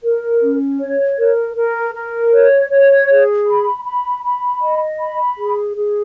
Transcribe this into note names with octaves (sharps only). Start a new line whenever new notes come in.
A#4
C#4
C#5
A#4
A#4
A#4
C#5
C#5
G#4
B5
B5
B5
D#5
B5
G#4
G#4